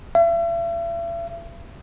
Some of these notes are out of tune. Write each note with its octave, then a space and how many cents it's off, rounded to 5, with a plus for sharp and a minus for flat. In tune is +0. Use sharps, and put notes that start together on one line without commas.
E5 +40